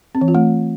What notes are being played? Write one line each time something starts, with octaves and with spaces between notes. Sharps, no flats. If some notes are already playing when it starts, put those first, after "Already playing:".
C4
E3
F4
A3